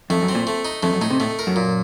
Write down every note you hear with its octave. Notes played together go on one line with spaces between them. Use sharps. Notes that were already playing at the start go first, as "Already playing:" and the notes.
F2 A3
F#2
C4
A#2
A3
D#4
F2 A3
F#2
A2 D#4
C3
A2 A3
A#4
F#2
A#2